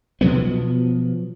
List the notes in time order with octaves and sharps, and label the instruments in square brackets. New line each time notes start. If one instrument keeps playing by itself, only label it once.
[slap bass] B2 F3 F#3 B3